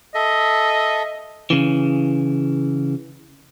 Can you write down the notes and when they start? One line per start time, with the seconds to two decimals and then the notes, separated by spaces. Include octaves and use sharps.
0.15 A4 D#5 E5
1.50 C#3 E3